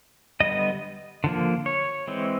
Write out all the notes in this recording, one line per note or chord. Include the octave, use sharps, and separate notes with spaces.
D3 G3 B3 D#5
D3 F3 A#3
C#5
E3 G#3 C4